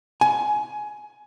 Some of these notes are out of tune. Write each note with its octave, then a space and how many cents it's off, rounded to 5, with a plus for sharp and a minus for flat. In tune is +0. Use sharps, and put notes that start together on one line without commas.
G#5 +15